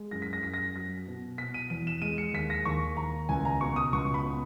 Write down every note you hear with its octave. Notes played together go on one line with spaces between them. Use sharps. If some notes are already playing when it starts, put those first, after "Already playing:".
Already playing: G#3
F#2 A#6
B6
A#6
F#2 B6
A#6
F#3 A#6
B2
B2 B6
D#7
E2 D#7
E7
G#3 D#7
C#7
D#2 B6
A#6
D#2 C#6
D#2 A#5
C#2 G#5
A#5
B2 C#6
D#6
C#2 C#6
B5
B2